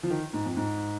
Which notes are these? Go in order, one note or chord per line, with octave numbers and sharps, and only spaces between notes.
F3
D#3
G#2
F2
G#2